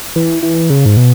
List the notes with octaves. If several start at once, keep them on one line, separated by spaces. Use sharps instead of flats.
E3
E3
C#3
G#2
B2